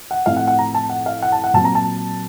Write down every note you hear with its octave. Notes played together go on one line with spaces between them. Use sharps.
F#5
A2 F3 C4 F5
F#5
F#5
A#5
A5
F#5
F5
F#5
A5
F#5
A#2 F#3 C4 A5
A#5
A5